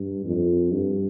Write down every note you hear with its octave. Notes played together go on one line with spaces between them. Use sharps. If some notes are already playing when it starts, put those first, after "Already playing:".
Already playing: G2
F2
G2